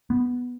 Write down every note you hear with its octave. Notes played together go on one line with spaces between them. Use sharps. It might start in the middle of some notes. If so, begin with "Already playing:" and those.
B3